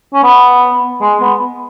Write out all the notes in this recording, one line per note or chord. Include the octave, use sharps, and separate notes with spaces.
C#4
B3
G#3
B3